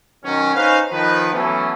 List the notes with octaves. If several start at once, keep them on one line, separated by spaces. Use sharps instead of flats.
B2 D#3 F#3 C#4
C#4 D#4 B4 C5 F5
D#3 F3 B4
E3 F#3 A3 B3 C#4